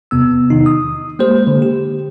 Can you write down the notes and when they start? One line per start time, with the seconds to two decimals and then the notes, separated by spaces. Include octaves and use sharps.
0.11 E2 C3 B3 E6
0.50 D#3 D#4
0.66 D#6
1.19 G#3 A#3 G4 C5
1.46 D3 A#3
1.62 G4